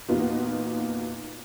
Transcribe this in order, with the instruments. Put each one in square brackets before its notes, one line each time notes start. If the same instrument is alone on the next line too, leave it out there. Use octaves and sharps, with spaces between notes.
[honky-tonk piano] E2 A#2 D#4 F4 F#4 B4